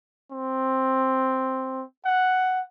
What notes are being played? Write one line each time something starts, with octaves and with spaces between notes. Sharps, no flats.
C4
F#5